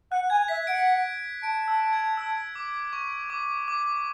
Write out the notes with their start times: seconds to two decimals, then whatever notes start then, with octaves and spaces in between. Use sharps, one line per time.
0.11 F#5 F#6
0.30 G#5 G#6
0.48 E5 B6
0.67 F#5 D7
1.43 A5 D7
1.68 E6
1.93 G#6
2.17 E6
2.55 D6
2.93 C#6
3.30 D6
3.68 D6